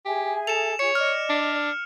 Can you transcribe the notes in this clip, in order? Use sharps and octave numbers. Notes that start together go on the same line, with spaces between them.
G4 G#4 E5 G#5
A4 E7 F7
F4 G#4 C#5 C#7
D5 D#5 F6
D4